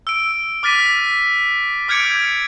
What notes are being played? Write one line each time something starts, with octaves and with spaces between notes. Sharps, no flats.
E6 D7
D6 F6 A6 B6 D#7
D6 F6 G6 G#6 C#7 D7